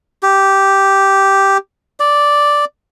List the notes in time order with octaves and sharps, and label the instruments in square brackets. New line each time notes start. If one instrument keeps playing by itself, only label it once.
[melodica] G4
D5